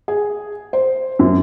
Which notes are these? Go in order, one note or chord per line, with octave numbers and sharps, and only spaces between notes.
G#4
C5
F#2